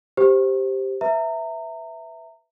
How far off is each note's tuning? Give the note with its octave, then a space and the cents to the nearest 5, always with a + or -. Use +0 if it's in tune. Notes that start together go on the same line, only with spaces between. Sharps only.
G4 +0 C5 +0
B4 +0 E5 +0 A#5 -30